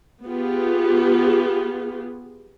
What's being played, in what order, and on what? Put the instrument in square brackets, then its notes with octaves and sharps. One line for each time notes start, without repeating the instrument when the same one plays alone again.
[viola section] B3 F4 G4 G#4